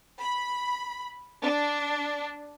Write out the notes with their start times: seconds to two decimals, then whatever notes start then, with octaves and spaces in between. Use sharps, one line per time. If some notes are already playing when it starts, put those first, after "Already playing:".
0.21 B5
1.43 D4